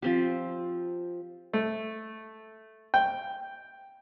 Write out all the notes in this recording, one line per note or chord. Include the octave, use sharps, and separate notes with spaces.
F3 C4 G4
A3
G5